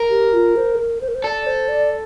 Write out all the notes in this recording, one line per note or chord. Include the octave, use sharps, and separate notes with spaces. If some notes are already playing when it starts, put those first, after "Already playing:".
Already playing: A#4
G4
F4
C5
A4
A#4
C5
A#4
C5
A4 D5
C5
D5